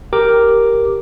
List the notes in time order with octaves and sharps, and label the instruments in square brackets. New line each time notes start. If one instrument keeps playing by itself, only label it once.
[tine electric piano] G4 A#4 D6